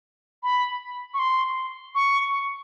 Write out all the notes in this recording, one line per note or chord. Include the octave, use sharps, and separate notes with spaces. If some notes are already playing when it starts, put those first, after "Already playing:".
B5
C#6
C6
C#6